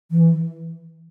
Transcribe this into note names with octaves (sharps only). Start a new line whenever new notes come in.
E3